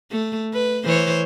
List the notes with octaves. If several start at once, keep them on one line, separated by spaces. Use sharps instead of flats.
A3
B4
E3 C5 C#5